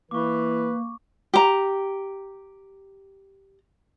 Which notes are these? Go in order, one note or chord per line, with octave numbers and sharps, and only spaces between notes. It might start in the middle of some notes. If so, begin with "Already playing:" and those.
E3 A#3 B4 C#6 D6
G4 A#5